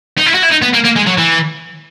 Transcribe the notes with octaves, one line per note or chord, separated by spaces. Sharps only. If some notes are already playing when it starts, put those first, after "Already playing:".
D#4
E4
F#4
E4
D#4
B3
A#3
A#3
G#3
F#3
E3